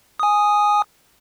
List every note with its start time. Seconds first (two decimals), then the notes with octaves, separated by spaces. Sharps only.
0.20 G#5 D#6